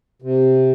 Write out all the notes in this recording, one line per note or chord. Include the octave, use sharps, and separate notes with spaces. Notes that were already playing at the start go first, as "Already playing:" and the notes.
C3